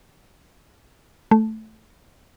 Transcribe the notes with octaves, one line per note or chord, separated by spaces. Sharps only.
A3